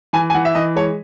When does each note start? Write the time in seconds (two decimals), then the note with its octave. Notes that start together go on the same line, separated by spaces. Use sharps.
0.13 E3 G#5
0.30 G#5
0.34 E3 F#5
0.45 E5
0.55 E3 D#5
0.76 G#3 C#5